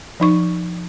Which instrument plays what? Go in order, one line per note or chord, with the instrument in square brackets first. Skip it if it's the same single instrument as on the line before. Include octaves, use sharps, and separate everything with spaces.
[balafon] F3 D#4 C#6